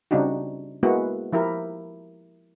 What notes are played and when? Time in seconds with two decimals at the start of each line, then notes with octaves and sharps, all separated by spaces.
0.11 C#3 G3 C4 D4 D#4 F#4
0.83 G#3 A#3 B3 E4 F#4
1.32 F3 E4 G4 A#4